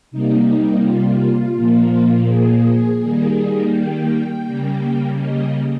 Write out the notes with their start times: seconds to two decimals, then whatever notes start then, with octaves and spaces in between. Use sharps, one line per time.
0.11 C3 G3 A#3 D#4
0.83 F4
1.55 A#2 F3 A#3
2.28 G#4
3.00 D#3 G3 A#3
3.72 G5
4.44 C#3 G3 A#3
5.17 D#5